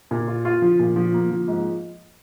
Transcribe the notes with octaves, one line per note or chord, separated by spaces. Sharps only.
A#2
F4
F4
F3
A#2
F3
A#3
F3
G#2